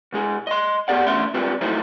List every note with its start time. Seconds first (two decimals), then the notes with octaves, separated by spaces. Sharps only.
0.13 B2 G#3 G#4
0.47 D#5 C6
0.88 B3 G4 G#4 D5 F#5
1.07 E2 D3 A3 C#4 E5 C6
1.34 C#2 G3 C4 F4 B4
1.61 F3 F#3 A3 D#4 E4 C5